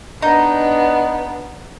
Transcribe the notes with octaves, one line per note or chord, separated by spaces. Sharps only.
B3 D4 D#4